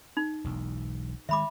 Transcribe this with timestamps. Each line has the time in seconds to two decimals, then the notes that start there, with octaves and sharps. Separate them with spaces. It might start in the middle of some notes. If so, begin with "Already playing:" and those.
0.17 D#4
0.44 E1 B1 E2
1.29 D#3 G#3 E5 B5 D6